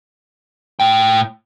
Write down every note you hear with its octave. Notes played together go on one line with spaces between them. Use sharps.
A2 G5